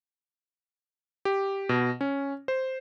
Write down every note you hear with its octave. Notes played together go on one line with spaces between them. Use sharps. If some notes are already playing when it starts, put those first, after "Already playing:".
G4
B2
C#4
C5